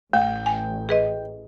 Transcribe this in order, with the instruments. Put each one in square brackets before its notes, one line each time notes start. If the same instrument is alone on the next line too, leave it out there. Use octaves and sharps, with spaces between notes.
[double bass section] A1 [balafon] A3 [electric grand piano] G5
[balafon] G#5
[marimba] G#4 B4 D#5